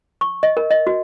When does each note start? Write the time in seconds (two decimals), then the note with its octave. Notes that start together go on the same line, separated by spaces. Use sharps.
0.21 C#6
0.43 D#5
0.57 A#4
0.71 D#5
0.87 F#4